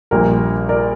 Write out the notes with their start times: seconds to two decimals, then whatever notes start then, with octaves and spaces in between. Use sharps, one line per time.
0.11 A#1 A#2 G3 A#4
0.69 A#4 D5